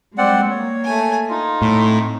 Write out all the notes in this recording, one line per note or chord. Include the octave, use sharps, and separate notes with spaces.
G3 G#3 C4 D5 F#5
A#3 C#5
A3 G#5
D#4 F4
A2 C4